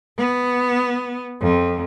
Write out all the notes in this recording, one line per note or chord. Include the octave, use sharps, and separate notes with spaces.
B3
F2